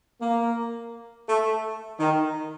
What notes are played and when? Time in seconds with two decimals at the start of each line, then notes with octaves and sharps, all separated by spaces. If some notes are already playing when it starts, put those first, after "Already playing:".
0.22 A#3
1.29 A3
2.00 D#3